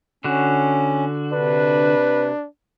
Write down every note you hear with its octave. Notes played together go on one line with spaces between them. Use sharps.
D3 C#4 F#4
C3 D4 B4